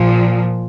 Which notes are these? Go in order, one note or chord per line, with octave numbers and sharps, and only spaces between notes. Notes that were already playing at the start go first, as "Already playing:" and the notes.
Already playing: A#2 F3